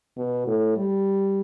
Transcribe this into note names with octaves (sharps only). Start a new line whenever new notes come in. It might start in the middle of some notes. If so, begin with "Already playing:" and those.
B2
A2
G3